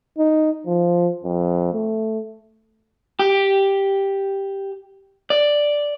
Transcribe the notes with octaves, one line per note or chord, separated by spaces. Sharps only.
D#4
F3
F2
A3
G4
D5